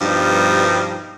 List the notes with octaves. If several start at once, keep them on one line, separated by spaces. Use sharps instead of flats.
G2 B2 F3 G3 D4 D#4